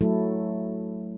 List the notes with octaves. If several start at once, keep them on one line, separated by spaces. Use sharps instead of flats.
F#3 A3 E4 A4